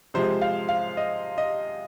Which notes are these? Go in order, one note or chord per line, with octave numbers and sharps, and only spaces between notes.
C3 F3 G#3 C5
F5
F5
D#5
D#5